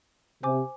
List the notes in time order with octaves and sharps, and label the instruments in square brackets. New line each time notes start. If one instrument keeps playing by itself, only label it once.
[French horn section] C3 [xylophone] C5 G#5 D6